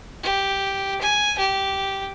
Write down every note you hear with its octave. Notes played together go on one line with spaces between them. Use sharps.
G4
G#5
G4